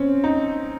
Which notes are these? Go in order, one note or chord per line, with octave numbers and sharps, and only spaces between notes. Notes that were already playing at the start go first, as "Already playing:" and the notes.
Already playing: C4 C#4
D#4